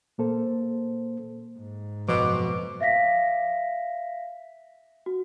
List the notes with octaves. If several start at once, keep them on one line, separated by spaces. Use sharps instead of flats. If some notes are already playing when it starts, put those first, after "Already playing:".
A#2 A#3 A4 C5
G#2
F#1 B2 F3 D6
E5 F5 A#6 B6
F#4